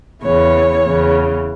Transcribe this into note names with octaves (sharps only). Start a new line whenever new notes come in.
E2 C#3 E3 C#5
E2 C#3 E3